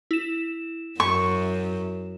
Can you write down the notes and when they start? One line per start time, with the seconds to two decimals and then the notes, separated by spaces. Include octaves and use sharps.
0.11 E4 E7
1.00 F#2 C#6